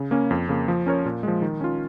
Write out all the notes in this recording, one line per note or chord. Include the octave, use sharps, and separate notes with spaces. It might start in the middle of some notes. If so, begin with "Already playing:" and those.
Already playing: C#3
A#3 C#4
F2
C#3 A#3
F3
C#4 A#4 C#5
A#2
F3 G#3
D#3
C#4 F4